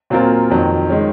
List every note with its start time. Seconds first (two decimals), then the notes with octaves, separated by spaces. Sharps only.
0.10 A#2 F#3 C4 F4 A#4
0.50 F2 D#3 F#3
0.90 D#3 G#3 C#4